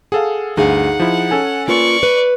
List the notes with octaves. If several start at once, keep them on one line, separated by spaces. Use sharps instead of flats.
G#4 A4 F5 F#5
D2 G2 D#4 G#4 F5 F#5
F3 E4
C#4 A4 G#5
A#3 F4 B4 D5 C#6
B4